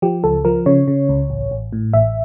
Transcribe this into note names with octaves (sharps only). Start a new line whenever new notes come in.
F3 G4
C#2 A4
F3 A#4
C#3 C#5
C#3
C#2
A1
A1
A2
A1 E5